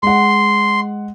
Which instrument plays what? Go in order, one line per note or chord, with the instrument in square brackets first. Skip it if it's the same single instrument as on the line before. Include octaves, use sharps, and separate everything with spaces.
[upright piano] G#3 F#5 [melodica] C6